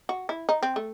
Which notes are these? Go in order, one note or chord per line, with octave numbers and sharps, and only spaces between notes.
F#4
E4
D#4
C4
A3